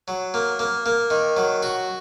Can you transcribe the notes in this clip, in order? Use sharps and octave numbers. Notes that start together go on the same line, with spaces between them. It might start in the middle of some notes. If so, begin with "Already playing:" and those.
F#3
A#3
A#3
A#3
D#3
F#3
F#4